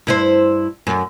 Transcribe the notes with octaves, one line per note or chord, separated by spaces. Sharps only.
G2 E4 C5
F#2